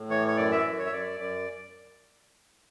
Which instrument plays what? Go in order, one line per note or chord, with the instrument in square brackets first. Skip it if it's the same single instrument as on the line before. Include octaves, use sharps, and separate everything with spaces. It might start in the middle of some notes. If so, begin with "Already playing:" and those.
Already playing: [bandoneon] A2
E3 C#5
C#5
F#2 D5
E5
F#2
C#5
E5
F#2 D5
F#2 D5